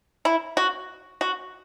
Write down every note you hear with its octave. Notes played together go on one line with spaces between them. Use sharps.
E4
F#4
F#4